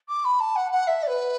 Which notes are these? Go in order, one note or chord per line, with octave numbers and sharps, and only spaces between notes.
D6
B5
A5
F#5
F#5
E5
D5
B4